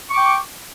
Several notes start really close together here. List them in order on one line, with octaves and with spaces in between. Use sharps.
C#6 D6 G5